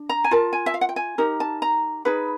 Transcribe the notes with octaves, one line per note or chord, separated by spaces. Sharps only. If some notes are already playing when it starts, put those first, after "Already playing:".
Already playing: D4
A#5
G#5
F4 A#4 A5
G#5
E5
F5
F#5
G5
G#5
D#4 G4 A#4
A5
A#5
D#4 G#4 B4 B5